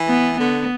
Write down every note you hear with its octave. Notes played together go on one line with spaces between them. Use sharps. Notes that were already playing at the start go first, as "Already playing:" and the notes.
Already playing: E3
B3
D3 B3